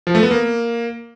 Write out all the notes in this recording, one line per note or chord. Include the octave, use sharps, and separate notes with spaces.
F3
A3
B3
A#3